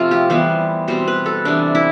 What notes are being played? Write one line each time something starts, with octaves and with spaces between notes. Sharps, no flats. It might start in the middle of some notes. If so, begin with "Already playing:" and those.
Already playing: C3 F3 A3 F4
G4
E3 G3 B3 C5
B2 G3 C4 C5
B4
A4
C3 E3 B3 D4
E4